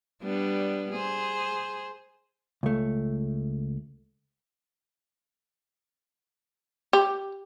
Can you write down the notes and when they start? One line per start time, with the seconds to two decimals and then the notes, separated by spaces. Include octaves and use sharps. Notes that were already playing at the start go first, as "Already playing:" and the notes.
0.23 G3 B3 D4
0.92 G#4 C5
2.63 C#2 A3
6.93 G4